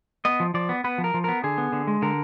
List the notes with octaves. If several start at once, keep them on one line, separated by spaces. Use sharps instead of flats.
B3 D#5
F3
F3 D5
B3
B3 B4
F3
A#4
F3
B3 A#4
D3 G#4
B3
D3
G#3
D3 A#4